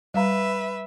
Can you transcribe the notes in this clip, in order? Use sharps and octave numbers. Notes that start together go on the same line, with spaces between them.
G3 B4 E5 F5 A#5